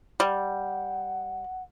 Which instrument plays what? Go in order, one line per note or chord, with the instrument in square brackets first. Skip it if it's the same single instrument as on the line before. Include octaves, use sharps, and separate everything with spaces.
[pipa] G3 [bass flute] F#5